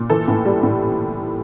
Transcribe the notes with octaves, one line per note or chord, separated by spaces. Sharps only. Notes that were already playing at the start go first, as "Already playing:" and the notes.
Already playing: A#2
E3 A4
A2
G3
A2